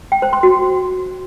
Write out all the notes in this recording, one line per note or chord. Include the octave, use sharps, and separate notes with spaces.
G5
C5
C6
F#4